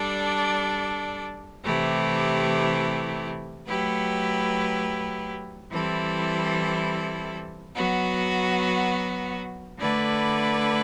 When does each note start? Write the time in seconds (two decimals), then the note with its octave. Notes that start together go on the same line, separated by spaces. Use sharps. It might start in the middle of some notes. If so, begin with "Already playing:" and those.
Already playing: G3 D4 A4 D5
1.65 C3 E3 A3 E4 G4
3.67 F#3 A3 E4 G4 B4
5.71 E3 G3 C4 E4 A4
7.75 F#3 B3 F#4
9.79 D3 A3 E4 B4 D5